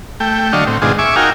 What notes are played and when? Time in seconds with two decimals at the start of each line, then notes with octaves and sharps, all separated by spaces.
0.20 A3 G5
0.53 D3 F#3 D4 D#5 F5 C#6
0.67 A2 C4
0.82 G#2 B2 D#3 D4 F4 G#4
0.99 E5 G#5 C#6 D6
1.16 D#4 F#4 A#4 F5 G5 G#5